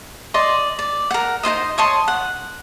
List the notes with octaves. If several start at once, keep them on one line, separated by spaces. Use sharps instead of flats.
D5 D#5 C6
D5
A#4 F#5
D#4 F4 C5 D#5
C#5 D#5 A5 C6
F#5